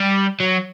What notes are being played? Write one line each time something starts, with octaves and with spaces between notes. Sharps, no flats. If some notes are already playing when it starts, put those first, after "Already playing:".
Already playing: G3
F#3